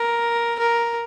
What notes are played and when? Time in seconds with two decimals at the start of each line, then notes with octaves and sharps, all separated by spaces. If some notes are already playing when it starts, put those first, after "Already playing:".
Already playing: A#4
0.59 A#4